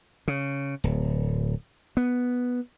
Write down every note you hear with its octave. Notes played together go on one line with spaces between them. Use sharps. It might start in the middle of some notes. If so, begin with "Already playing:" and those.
C#3
D1
B3